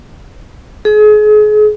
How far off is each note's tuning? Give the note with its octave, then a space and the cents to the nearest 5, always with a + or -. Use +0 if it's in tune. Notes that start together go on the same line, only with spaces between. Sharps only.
G#4 +35